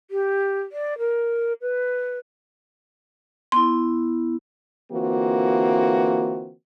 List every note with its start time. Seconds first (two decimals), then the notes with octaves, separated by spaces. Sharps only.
0.11 G4
0.72 D5
0.99 A#4
1.62 B4
3.52 B3 E4 C6
4.92 D3 E3 A#3 C4 F4 F#4